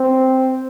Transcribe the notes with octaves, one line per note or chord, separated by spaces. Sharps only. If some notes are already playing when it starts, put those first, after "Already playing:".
Already playing: C4